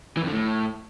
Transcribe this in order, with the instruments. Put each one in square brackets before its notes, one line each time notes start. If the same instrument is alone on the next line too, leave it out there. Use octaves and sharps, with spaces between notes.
[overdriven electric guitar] E3
F2
D3
A2